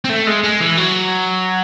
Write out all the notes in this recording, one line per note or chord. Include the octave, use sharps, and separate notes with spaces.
C4
A3
G#3
G#3
E3
F#3